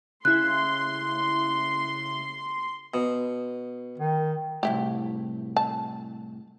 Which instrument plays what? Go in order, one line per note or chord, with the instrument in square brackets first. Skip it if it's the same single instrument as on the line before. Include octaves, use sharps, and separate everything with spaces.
[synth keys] C#3 E4 [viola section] C6 [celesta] F#6
[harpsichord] B2
[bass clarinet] D#3
[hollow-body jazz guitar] C2 A2 [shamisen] E4 G4
[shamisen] A5